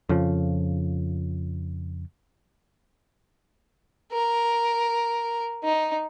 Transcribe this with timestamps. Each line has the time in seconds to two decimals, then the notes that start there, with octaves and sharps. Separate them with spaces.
0.09 F2 C#3 F3
4.12 A#4
5.64 D#4